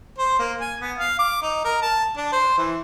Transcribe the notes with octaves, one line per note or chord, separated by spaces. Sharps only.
C5
A#3
G#5
B3
F5
D6
D#4
A#4
A5
D4
C5
E3